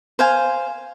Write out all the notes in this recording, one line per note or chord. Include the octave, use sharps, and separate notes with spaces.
C5 F5 G#5